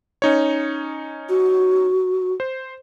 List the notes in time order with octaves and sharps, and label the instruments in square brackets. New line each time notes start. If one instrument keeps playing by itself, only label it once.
[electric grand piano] C#4 D#4 C#5
[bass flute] F#4
[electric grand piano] C5